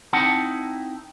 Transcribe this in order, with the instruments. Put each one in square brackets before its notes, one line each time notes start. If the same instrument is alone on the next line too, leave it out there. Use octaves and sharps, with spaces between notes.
[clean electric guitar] C4 D#4 E4 F#5 A5